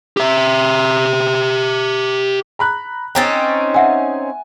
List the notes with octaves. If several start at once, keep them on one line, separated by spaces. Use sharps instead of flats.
G4 E5
A#5 B5 F#6
C4 C#4 D#4 G5 A6
E5 F#5 G#5 E6